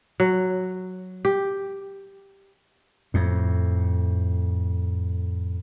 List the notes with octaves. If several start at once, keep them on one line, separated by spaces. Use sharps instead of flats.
F#3
G4
F2 A2